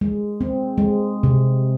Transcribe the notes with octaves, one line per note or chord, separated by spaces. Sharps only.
G#3
C4
G#3
C3